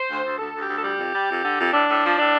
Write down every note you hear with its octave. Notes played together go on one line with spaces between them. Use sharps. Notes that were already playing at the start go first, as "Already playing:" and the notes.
Already playing: C5
D2
D2
D2 A4
D2
G4
D2
A4
G3 G4
F2
G3
F2
D3
F2
A2 D4
A2
F3
A2 D4